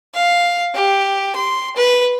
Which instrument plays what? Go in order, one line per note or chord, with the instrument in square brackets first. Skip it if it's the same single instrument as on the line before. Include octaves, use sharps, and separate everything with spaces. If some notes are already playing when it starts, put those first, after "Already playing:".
[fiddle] F5
G4
C6
B4